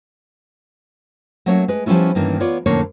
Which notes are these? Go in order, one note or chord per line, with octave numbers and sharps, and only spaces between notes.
F#3 A3 A#3 C#4 C#5 F#5
G#3 B4
F3 G3 B3 C#4 E4 F4
G2 D#3 E3 A#3 B3 C#4
B3 F4 C#5 D5
F2 A2 D3 A#3 C#4 C#5